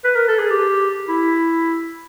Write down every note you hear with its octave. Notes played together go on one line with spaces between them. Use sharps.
B4
A#4
A4
G#4
G4
E4